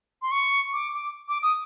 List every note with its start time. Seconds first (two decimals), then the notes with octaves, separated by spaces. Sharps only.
0.22 C6
0.31 C#6
0.73 D6
0.94 D6
1.29 D6
1.42 D#6